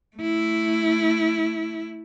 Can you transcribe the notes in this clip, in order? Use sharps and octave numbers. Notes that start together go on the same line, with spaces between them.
A3 E4